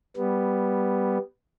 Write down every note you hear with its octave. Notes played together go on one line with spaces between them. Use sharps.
G3 B3